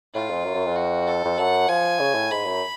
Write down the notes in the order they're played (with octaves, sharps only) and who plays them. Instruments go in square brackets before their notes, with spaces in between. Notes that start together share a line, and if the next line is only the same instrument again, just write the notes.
[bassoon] A2 [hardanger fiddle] F4
[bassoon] F2
F#2
F#2
F2
[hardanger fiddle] F#4
A4
[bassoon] F2
[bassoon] F#2 [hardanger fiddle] F#5
[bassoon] F3 [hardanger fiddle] G#5
[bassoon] C#3
A2
[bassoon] G#2 [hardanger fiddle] B5
[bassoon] F#2